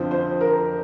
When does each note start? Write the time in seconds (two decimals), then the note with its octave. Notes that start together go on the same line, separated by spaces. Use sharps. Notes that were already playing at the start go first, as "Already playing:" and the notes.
Already playing: F2 D3 F3 C5
0.11 C5
0.41 A#4